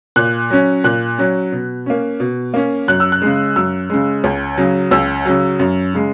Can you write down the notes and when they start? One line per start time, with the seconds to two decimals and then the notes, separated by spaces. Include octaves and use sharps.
0.16 A#2 F#6
0.50 F#3 C#4
0.84 A#2 F#6
1.18 F#3 C#4
1.52 B2
1.86 A#3 C#4
2.20 B2
2.54 A#3 C#4
2.88 F#2 F#6
3.00 E6
3.12 F#6
3.22 C#3 G#3
3.56 F#2 E6
3.90 C#3 G#3
4.24 C#2
4.58 C#3 F#3
4.91 C#2 E6
5.26 C#3 F#3
5.59 F#2
5.94 C#3 G#3